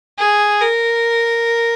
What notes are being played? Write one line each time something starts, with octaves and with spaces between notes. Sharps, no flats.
G#4
A#4